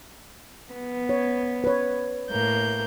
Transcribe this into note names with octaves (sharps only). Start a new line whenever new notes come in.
B3
C#5
B4 C#5
A2 A#3 G6